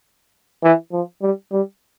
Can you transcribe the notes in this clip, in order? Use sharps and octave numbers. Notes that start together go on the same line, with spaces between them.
E3
F3
G3
G3